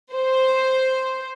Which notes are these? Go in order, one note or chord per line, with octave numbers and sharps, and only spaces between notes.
C5